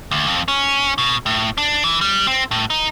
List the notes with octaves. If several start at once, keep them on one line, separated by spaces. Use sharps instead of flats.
D2
F2
C#4
B2
A2
D4
E3
G3
C4
A2
D#4